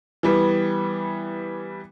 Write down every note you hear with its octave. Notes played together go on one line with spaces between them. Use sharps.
E3 G3 B3